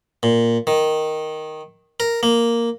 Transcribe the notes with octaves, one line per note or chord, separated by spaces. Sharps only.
A#2
D#3
A#4
A#3